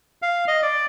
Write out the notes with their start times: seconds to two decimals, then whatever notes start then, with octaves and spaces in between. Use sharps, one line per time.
0.22 F5
0.48 D#5
0.62 D5